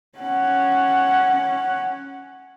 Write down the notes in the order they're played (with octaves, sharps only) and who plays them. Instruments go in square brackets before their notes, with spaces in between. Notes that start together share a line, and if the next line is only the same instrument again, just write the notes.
[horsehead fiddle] C#4 F#5